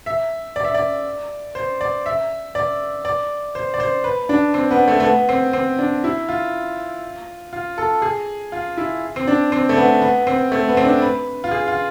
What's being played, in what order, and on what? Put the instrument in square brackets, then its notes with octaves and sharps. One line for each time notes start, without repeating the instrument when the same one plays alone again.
[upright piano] E5
D5
E5
D5
C5
D5
E5
D5
D5
C5
D5
C5
B4
D4
C4
B3
A3
A3
B3
C4
C4
D4
E4
F4
F4
A4
G#4
F4
E4
C4
D4
C4
A3
B3
B3
C4
A3
B3
C4
D4
B4
F4
G#4
F4